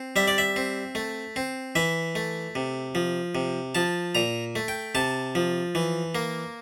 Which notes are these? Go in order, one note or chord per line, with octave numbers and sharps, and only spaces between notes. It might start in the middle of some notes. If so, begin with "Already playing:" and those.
Already playing: C4
G3 E5
D5
E5
C4
A3
C4
E3 E5
A3
C3
F3
C3
F3 A5
A#2 A#5
A3
G5
C3 A5
F3
E3
A#3